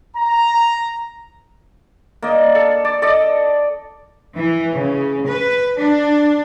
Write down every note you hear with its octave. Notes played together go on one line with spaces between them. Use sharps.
A#5
A#3 D5 D#5
A4
D5
A4 D5 D#5
E3
C#3
B4
D4